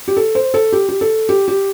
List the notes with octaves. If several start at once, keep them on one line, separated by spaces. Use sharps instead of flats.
G4
A4
C5
A4
G4
G4
A4
G4
G4